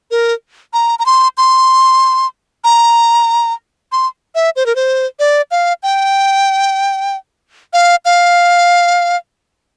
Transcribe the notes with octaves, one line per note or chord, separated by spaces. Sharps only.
A#4
A#5
A#5
C6
C6
A#5
C6
E5
C5
A#4
C5
D5
F5
G5
F5
F5